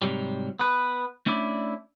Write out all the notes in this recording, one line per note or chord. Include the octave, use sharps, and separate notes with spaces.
G#2 C3 F#3 G3
B3 B4
A3 C#4 D4 E4 D5